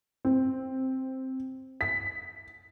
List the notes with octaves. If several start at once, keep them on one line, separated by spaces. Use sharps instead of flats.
C4
B6